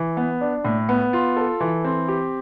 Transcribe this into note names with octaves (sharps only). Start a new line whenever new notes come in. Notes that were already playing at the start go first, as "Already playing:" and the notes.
Already playing: E3
B3
D4
A2
B3
F4
A4
E3
C4
G4